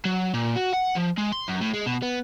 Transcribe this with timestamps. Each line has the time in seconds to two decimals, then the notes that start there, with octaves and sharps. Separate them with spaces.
0.05 F#3
0.34 A#2
0.56 F#4
0.73 F#5
0.96 F3
1.18 G#3
1.32 C6
1.48 F#2
1.61 A2
1.74 G#3
1.86 B2
2.02 B3